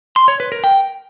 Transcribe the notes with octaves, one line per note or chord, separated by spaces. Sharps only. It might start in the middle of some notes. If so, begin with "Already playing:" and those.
C6
C#5
B4
A#4
G5